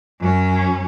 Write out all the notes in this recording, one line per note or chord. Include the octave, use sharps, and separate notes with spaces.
F#2 C#4